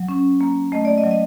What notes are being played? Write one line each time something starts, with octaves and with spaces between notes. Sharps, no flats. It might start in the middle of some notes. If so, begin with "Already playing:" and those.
Already playing: F#3
C#4
A#3
A3 D#5
D5
D#5
F#3
D#5